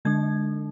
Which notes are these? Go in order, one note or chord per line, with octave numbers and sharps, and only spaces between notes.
D3 G#3 D4 G#6